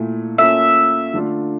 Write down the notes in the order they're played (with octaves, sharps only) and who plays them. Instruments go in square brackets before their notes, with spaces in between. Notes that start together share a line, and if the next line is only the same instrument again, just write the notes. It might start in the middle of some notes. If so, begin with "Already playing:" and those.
Already playing: [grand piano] A#2 A3 E4
[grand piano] A#3 C#4 F4 A4 [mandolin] E5
[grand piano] D3 A3 D4 F4